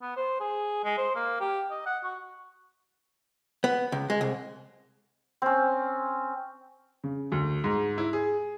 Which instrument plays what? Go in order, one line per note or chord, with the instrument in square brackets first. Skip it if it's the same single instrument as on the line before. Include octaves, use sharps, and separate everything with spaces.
[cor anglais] B3
C5
G#4
G#3
C5
A#3
G4
D#5
F#5
F#4
[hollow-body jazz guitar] B3
C#2
G#3
C2
[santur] C4 C#4
[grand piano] C#3
D2
G#2
E4
G#4